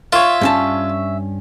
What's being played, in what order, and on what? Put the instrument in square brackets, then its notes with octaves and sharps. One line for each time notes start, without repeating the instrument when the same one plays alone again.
[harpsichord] F4 [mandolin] C#5 E5
[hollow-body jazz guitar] G2 C#4 A5